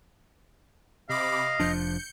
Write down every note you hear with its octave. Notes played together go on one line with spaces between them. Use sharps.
C3 D#5 F5 B5 D6
F1 F3 D4 G6 C#7